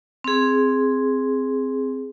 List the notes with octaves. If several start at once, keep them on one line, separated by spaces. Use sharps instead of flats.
C4 G#4